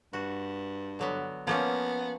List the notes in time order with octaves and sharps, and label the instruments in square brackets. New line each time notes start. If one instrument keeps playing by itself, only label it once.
[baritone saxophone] G2 [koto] F#4
[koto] D3 F#3 B3
[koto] F3 A#3 C#4 [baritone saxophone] B3